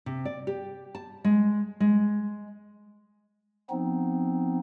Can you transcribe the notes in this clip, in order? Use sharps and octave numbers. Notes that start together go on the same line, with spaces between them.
C3
D5
G4
A5
G#3
G#3
F3 B3 C4 D#4